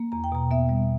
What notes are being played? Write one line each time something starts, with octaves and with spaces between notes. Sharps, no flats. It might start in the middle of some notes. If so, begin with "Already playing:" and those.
Already playing: A#3
E2 A#5
G5
B2 A#5
B3 E5
G3